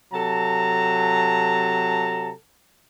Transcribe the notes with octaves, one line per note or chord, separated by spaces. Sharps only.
C3 F#3 A4 A5 A#5